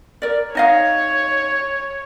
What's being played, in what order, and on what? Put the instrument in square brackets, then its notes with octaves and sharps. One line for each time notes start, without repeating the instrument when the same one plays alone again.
[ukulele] A#4 D5
[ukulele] D#4 D#5 F5 [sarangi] C#5